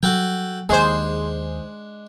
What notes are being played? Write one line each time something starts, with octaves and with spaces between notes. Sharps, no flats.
F#3 G3 F#4 A4 G5
D#2 G#3 D4 G#4 C5